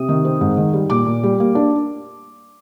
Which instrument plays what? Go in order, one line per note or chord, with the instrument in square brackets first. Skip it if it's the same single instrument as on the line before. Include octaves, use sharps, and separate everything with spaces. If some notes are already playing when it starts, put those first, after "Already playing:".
Already playing: [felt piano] C3 D#6
D#3
C4
G#2
D#3
G3
A#2 D6
A#2
G3
A#3
D4